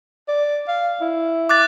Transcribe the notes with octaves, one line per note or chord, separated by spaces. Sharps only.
D5
F5
E4
D6 F#6 A6